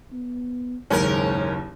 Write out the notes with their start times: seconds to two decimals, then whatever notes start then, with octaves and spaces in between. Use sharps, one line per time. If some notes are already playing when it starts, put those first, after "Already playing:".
0.12 B3
0.90 F#1 D#2 G#2 C#4 A#4